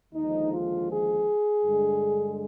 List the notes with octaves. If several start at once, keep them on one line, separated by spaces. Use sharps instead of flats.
D#2 D3 F3 G#3 D#4
F4
G#4
G2 D3 G#3